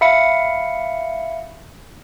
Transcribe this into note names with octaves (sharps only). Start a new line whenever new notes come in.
E5 F5 B5 C#7